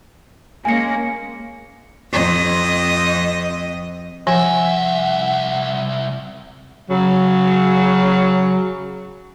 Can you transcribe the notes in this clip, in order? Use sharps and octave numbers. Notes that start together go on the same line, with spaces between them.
G#3 A#3 C#4 G#5 C#7
F2 D#5
C2 F3 E5 F#5 G#5
C#3 F#3